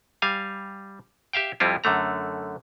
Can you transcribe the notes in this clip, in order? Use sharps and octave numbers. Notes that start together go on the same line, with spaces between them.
G3 F5 G#5
G4 E5 F5 G5
F2 G3 C4 E4 F4
F#2 D3 A3 A#5